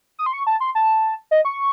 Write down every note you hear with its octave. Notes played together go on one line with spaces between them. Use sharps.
D#6
C6
C#6
A5
C6
A5
D#5
C#6